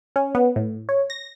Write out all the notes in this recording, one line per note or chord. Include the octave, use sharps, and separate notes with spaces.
C#4
B3
A2
C#5
A#6